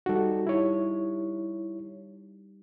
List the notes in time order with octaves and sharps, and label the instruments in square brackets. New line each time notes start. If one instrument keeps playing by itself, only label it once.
[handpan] G3 D#4 [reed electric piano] F#4 A4
[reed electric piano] E4 C#5